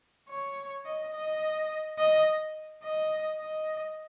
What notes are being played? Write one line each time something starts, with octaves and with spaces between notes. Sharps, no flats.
C#5
D#5
D#5
D#5
D#5
D#5